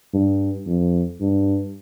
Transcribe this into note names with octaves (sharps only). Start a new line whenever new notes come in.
G2
F2
G2